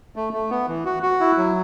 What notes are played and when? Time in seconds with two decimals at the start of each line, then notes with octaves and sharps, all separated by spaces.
0.16 A3
0.33 A3
0.51 B3
0.68 E3
0.85 F#4
1.03 F#4
1.20 E4
1.38 F#3